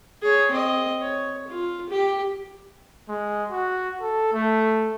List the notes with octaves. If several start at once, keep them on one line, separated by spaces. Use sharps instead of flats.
G#4 C#5
C4 D#5
C#5
F4
G4
G#3
F#4
A4
A3